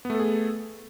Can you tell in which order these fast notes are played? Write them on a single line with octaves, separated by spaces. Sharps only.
B3 A3 A4 G#4